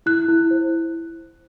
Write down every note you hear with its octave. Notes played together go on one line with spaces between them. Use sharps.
E4 F#6
E4
C5